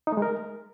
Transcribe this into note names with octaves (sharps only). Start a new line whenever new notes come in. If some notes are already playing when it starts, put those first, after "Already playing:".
D#4
A3
G#3
A#4